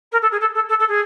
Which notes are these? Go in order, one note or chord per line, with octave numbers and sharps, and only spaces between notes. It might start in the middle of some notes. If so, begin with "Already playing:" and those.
A#4
A4
G#4
A4
A4
A4
A4
G#4